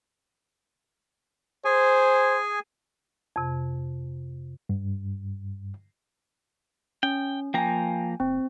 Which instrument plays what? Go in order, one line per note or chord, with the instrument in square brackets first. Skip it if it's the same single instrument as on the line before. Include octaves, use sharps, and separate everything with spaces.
[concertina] G#4 G#5 [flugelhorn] C5
[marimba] F2 C3
[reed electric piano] G2
[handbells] C#4 [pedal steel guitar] G5
[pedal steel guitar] F3 A#3 A#5 [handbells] G5 G#5
[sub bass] F#1 [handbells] C4